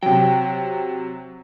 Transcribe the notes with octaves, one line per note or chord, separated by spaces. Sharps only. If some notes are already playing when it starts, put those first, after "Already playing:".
C3 F#3 G5